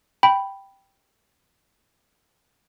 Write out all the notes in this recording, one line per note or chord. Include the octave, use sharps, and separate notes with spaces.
G5 B5